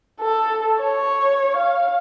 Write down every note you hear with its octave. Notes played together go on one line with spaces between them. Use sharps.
A4
C#5
F5